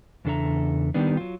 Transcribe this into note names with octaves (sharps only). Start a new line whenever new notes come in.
E2 C#3 D4 A4 E5 A#5
D#3 G3 B3 D4
F#3 F4